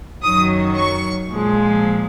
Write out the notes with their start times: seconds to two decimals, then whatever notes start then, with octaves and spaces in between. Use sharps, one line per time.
0.22 F#2 D#3 F#3 D#6
0.76 C#6
1.29 A#2 F3 G#3